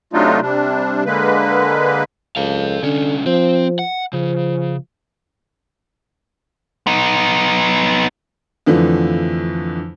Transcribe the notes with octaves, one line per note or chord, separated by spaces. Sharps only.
C3 F#3 A3 D4 D#4 F4
C3 G3 D4
D3 G#3 A#3 B4
C#2 A4 F5
C2 D3 C#4
F3 C4
F#5
C#3 F3
B3 D#4
F2 D3 E3 F3 A3